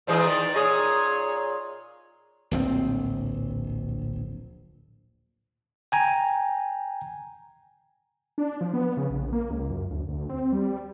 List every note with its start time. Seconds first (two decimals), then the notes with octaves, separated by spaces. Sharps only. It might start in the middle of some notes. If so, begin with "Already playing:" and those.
0.07 A#2 E3 G#3 C5
0.25 D#3 D5
0.54 A#2 G#4 C#5 D#5
2.51 D1 A#1 C4
5.92 G5 G#5 A#5
8.38 D4
8.61 F3
8.74 B3
8.97 C#3
9.10 A#1
9.33 A#3
9.51 C#2
9.70 F#2
9.91 D2
10.09 D2
10.30 C4
10.52 G3